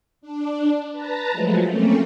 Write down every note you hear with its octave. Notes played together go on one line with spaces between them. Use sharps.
D4
B4 A5 A#5
F3 F#3 G#3 A3
A3 A#3 C4 C#4